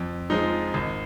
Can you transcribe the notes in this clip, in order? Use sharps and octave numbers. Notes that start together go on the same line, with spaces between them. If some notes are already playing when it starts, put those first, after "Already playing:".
Already playing: F2
F3 G#3 D#4
G#1